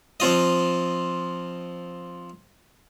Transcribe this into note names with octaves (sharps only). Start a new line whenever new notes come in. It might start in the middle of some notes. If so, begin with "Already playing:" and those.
F3 C4 F4 D#5